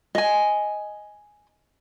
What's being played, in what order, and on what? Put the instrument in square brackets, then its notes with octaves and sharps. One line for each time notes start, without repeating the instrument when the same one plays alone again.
[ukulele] D#5 G#5